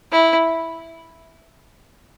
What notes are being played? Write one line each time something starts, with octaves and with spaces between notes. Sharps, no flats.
E4